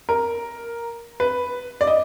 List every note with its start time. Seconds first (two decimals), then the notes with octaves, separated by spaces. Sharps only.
0.09 A#4
1.20 B4
1.81 D5
1.87 D#5